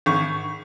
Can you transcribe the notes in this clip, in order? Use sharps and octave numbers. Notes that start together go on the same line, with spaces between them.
G#1 C#6